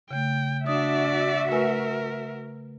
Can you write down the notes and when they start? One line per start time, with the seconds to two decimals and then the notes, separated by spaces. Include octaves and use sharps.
0.11 C#3 A3 G5
0.66 D4 F#4 D5 E5 D#6
1.51 A3 A#4 B4 G#5